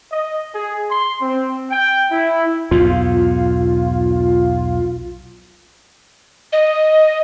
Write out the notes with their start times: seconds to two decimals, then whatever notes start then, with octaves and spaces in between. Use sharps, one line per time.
0.11 D#5
0.55 G#4
0.90 C6
1.22 C4
1.69 G5
2.11 E4
2.71 B1 E2 G#2 F4
6.52 D#5